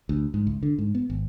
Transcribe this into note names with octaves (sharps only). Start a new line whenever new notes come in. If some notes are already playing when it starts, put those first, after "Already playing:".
D2
G#2
C#2
D3
G#2
B3
G#1